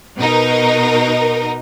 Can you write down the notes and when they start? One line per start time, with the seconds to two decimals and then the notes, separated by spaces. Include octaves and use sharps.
0.17 B2 D#4 A#4